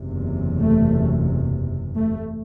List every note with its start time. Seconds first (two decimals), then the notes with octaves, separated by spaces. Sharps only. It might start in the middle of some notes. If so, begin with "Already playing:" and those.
Already playing: F#1 E2 C3
0.60 A3
1.96 A3